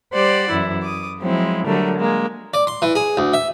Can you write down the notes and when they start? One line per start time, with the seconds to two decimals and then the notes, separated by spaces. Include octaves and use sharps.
0.13 G3 G4 C5 D5 F#5
0.50 F#2 E3 E4
0.82 D6 D#6
1.20 F3 F#3 G#3 C4 E4
1.66 D3 F#3 G3 A3 A#4
1.97 G#3 A#3
2.54 D5
2.67 C6
2.82 E3
2.95 G#4
3.17 D2
3.33 E5